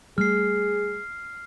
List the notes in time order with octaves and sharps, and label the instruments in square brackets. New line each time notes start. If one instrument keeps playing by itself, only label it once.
[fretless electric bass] G3 A3 [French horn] G#4 [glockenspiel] F6 C7